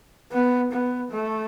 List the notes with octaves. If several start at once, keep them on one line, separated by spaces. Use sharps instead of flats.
B3
B3
A3